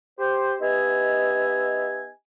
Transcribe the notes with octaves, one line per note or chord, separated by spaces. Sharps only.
G4 C5
B3 D#4 G4 D#5 E5 G#5